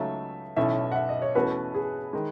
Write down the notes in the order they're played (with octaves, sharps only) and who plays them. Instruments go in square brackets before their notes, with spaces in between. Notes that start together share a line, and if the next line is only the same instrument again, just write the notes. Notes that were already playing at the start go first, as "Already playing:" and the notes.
Already playing: [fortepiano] C#2 C#3 F#3 A3 D#4 [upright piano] E5
[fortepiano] B1 A2 E3 A3 C#4 [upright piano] E5
[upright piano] F#5
E5
D#5
C#5
[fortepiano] E2 B2 A3 C#4 F#4 [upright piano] B4
[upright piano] G#4
[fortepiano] D#3 G#3